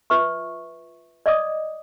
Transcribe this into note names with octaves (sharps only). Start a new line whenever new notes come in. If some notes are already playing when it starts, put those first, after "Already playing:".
F4 B4 E5 C#6
D5 D#5 D6 D#6